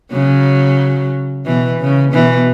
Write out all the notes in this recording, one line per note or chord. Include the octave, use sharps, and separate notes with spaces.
C#3 F#3
B2 E3
C#3
B2 E3